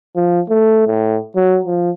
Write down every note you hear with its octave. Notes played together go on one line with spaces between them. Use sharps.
F3
A3
A2
F#3
F3